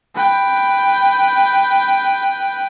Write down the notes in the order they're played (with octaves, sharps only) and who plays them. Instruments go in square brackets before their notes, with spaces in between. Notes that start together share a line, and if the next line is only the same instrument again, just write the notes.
[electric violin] B4 G5